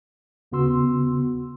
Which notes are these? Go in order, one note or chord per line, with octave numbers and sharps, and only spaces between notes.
D#2 C#3 B3 F#4 C6 E6